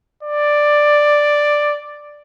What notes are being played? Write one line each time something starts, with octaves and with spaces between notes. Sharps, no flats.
D5